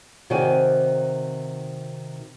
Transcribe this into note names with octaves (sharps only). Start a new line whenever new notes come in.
C3 D#3 F#4 C5 D5 G#5